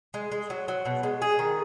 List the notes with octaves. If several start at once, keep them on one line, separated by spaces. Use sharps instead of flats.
G#3
G#3
F#3
F#3
B2
G#3
G#4
D#3